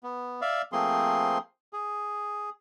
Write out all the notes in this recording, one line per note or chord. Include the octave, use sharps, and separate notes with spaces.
B3
D5 E5 F5
F3 A3 A#3 C4 G#4 C6
G#4